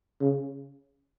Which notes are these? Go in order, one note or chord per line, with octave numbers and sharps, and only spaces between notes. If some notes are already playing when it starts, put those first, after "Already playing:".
C#3